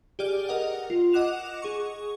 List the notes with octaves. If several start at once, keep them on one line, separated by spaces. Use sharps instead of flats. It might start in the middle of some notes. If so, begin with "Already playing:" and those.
G4 G#4 D5 F6
A#4 D#5 F#5
F4
D#5 F#5 D6 F#6 E7 F7
G#4 C#6